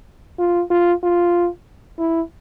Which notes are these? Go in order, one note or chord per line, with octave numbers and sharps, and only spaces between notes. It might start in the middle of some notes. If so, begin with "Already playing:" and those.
F4
F4
F4
E4